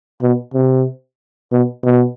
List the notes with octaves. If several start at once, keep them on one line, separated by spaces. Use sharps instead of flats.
B2
C3
B2
B2